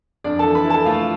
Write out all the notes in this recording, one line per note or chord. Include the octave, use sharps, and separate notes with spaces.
F2 D4 D5
E3 A4 A5
B4 B5
E4
A4 A5
A3 F4 F5